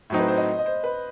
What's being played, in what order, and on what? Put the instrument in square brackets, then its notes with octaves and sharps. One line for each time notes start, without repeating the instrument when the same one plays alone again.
[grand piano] A2 F#3 C4 D#4
[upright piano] B4
C5
D#5
D#5
C5
B4